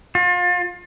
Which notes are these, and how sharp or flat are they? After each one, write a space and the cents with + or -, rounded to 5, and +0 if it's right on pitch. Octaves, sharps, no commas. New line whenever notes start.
F4 +35